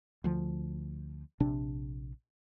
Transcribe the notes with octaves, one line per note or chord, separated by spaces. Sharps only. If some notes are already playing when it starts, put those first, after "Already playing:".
D2 F3
A#1 C3 D4